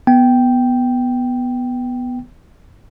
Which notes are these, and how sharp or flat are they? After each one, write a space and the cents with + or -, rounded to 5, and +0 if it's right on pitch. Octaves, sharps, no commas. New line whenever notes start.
B3 +0 G5 -5